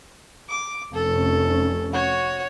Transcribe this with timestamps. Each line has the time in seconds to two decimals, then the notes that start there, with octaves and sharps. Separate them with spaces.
0.49 D6
0.94 F1 C#4 A4
1.93 F#4 C#5